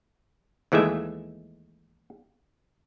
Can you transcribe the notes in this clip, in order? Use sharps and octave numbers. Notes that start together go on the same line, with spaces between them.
D#2 E3 G#3 A3 E5